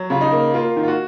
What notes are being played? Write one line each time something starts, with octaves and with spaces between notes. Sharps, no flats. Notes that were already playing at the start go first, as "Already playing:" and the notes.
Already playing: F#3
C#3 F4
D#4
A#3
A#3 F4
D#3
F4
F#4